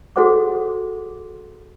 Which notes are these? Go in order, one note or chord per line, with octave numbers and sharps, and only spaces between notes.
F#4 G#4 A4 C5 F#5 D6